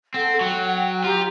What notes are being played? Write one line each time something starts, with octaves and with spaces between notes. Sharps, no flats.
C4 A4 F#5
F#3 G5
F4 G4 A#5